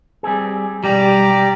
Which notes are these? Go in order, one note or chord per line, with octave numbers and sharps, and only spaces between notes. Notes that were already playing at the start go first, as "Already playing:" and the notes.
G3 C4 G#4
B1 G3 G4 D5 A#5